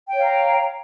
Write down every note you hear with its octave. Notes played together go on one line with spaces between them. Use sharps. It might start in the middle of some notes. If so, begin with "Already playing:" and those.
C#5 F5 G5 A#5